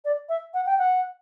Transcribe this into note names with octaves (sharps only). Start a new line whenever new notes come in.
D5
E5
F#5
G5
F#5